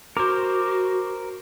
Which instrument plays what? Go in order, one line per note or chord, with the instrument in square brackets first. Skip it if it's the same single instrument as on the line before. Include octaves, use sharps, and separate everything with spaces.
[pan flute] F#4 [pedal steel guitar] A#4 C5 [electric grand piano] D6